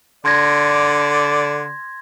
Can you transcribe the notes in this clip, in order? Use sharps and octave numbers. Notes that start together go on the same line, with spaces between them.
D3 D5 C6 G#6 A#6